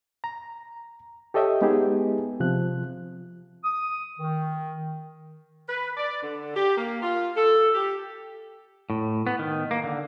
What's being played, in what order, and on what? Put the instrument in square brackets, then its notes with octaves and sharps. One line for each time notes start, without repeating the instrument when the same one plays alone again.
[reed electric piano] A#5
G4 A4 C#5 D#5 E5 G5
G#3 B3 D#4 G4 G#4
C3 F3 F#6
[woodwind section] D#6
D#3
[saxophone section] B4
D5
D3
G4
A#3
F4
A4
G4
[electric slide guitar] A2
B3
D#3
A#3
D3